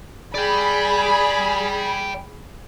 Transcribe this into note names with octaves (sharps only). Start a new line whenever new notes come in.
G#4 D5 G5 B5